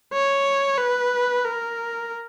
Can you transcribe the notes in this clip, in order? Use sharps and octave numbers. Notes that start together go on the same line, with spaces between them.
C#5
B4
A#4